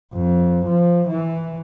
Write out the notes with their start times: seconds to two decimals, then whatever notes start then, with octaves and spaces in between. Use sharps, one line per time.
0.14 F2
0.66 F3
1.08 E3